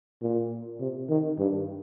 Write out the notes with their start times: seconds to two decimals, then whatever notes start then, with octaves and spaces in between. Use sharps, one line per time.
0.22 A#2
0.80 C3
1.09 D#3
1.39 G2